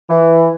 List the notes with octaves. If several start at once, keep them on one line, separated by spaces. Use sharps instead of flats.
E3